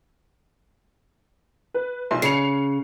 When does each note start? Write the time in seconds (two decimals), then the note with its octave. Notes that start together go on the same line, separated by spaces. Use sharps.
1.74 B4
2.11 B1 C6
2.22 C#3 C7 C#7 F7